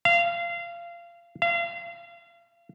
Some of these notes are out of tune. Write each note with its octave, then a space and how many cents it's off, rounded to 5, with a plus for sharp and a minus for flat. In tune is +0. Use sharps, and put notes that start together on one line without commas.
F5 -25
F5 -35